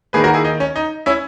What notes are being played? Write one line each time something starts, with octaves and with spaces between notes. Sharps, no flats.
D#3 A#3 G#4 B4
F#4 A#4
E4 G#4
D#4
C#4
D#4
C#4 E4